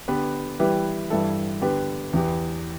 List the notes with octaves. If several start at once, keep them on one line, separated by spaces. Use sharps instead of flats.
D3 B3 G4 B4
E3 G3 E4 G4 B4
G2 E3 G3 E4 A4
D3 B3 G4 B4
E2 E3 B3 G4